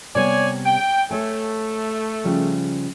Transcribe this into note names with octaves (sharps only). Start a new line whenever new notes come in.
C3 G3 B3 C#5 D5 G#5
G5
A3 C#5 G#5
C#3 F3 G3